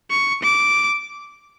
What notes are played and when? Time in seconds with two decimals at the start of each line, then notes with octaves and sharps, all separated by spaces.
0.10 C#6
0.43 D6